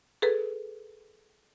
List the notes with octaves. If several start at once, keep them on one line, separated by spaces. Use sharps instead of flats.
G#4 A4 B4